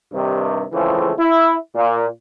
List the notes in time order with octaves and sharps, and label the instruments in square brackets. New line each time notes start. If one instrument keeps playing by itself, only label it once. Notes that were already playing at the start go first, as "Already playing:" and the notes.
[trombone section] G2 C3 D#3
C#3 E3 F3 G#3 A3 C4
E4
A#2